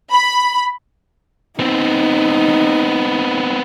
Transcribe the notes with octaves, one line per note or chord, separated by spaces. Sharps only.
B5
B3 C4 D#4